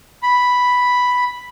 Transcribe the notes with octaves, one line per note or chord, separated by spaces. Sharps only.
B5